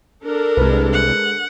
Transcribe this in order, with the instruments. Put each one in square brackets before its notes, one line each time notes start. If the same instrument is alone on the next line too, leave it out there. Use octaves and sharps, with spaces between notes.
[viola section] D4 A4 A#4
[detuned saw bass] C2 [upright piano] G#3 B4
[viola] F#5